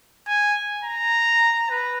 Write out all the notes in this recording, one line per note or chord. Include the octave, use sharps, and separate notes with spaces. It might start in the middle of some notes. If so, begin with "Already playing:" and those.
G#5
A#5
B4